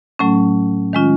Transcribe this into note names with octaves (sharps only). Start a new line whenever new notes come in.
A2 F#3 A3 C#4
D#3 G#3 C#4 F4